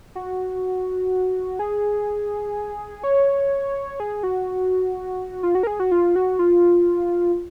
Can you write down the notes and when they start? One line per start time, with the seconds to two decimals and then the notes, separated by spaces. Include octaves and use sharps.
0.15 F#4
1.59 G#4
3.03 C#5
4.00 G#4
4.23 F#4
5.43 F4
5.55 F#4
5.63 A#4
5.67 G#4
5.80 F#4
5.91 F4
6.16 F#4
6.39 F4